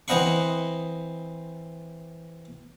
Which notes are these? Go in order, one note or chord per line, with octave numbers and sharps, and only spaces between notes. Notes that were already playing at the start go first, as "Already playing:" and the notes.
E3 C4 D#5 F#5 B5 C#6